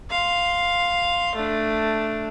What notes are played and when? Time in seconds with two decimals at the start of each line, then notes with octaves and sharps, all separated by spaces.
0.10 F5 C6
1.35 A3 D4